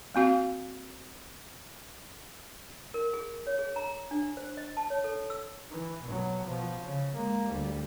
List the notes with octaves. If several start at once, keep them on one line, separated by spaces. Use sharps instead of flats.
A#3 C4 F#4 F5
A#4
G#4
C#5
G#4
A#5
D4
C5
D#5
A5
C#5
A4
E6
E3
B2 F#3
B2 F3
C#3
G#3 A#3
D2 G3